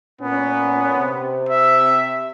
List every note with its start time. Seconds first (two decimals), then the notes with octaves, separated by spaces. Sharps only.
0.21 A#2 B3 C#4
0.99 C3 C4
1.49 E5